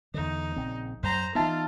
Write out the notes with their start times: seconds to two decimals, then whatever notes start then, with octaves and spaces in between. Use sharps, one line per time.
0.14 E2 D3 D#4
0.56 A#1 C#3 C4
1.03 F#2 C5 A#5
1.35 E3 B3 D#4 F4 E5 A5